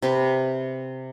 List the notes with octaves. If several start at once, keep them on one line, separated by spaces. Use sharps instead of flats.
C3 G4 B4